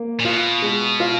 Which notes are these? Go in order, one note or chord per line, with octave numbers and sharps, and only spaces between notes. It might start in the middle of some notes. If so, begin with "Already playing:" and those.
Already playing: A#3
A#2
B2 F4
G#3
F4